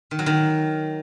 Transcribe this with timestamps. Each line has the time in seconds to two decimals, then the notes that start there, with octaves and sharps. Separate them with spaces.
0.11 D#3
0.19 F#3
0.26 D#3